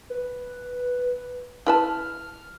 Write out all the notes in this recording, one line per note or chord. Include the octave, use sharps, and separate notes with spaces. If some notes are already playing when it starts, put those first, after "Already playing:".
B4
E4 B4 A5 F6